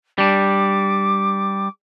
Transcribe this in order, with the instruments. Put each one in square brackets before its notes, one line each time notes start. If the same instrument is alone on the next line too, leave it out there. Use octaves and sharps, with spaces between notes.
[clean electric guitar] G3 D4 [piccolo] D6